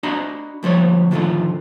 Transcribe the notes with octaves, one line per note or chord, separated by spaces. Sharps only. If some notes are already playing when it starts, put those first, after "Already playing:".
D4 F#4 D#5 A#5 B5
D2 F3 G3 C#5
A2 D3 D#3 F3 A3 F4